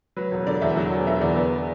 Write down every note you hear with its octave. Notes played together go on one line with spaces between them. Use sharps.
F#3 B4
E1
D3 D5
E2 E5
F#3
E1
D3 E5
E2 D5
B3